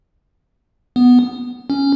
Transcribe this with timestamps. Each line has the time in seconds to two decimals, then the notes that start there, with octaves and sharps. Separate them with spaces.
0.96 B3
1.70 C#4